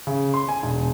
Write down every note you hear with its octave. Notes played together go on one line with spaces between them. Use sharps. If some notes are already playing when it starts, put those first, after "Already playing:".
C#3
C6
G#5
E1